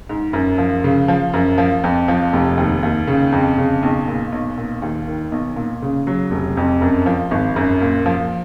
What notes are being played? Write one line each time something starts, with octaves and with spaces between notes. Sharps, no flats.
G#2
F#2
F3
C#3
F3
F#2
F3
F2
F3
F1
D#2
D#2
C#3
F2
C#3
B1
A#2
B1
A#2
D#2
D#3
B1
A#2
C#3
F#3
F1
F2
F#2
F3
G#1
F#2
A#2
F3